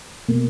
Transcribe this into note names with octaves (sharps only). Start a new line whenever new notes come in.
B2 A#3